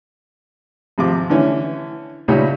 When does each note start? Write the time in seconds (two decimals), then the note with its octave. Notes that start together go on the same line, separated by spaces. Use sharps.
0.98 G#1 C3 F3 F4 D6
1.30 D3 E3 A3 C#4
2.28 C#2 A#2 G3 A3 D#4 C#5